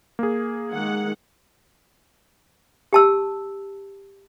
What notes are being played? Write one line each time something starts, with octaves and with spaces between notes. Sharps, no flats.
A#3 G#4
D#3 G#3 F#5
G4 A5 E6